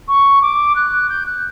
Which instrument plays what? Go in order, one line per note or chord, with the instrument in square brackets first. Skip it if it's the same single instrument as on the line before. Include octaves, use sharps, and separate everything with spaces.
[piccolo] C#6
D6
F#6
G6
F#6